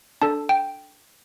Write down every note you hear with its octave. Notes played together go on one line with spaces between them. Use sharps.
D4 A4 A5
G5